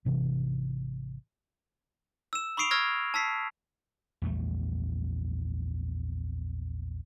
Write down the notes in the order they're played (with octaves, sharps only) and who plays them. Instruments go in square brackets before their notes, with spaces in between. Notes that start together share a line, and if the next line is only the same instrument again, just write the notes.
[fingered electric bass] G#1 C3 E3
[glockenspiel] E6 E7
B5 C#6 D#6 C7 D7 F7
C#6 E6 F6 G#6 A#6
A5 E6 B6 C7
[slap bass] A#1 E2 G3 A3